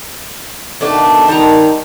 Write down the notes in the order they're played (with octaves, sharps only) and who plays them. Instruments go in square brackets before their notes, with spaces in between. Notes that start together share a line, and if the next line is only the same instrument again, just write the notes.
[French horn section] B2 D#3 [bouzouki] A3 D4
[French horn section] D#3 [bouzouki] G3 A5 A#5